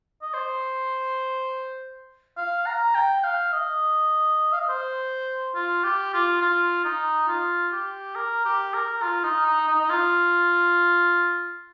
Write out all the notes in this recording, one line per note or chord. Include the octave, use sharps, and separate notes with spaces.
D#5
C5
F5
A#5
G5
F5
D#5
F5
D#5
C5
F4
G4
F4
F4
D#4
F4
G4
A#4
G4
A#4
F4
D#4
D#4
D#4
D#4
F4